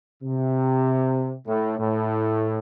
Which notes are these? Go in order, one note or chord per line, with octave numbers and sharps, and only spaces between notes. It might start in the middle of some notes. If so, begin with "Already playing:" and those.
C3
A2
A2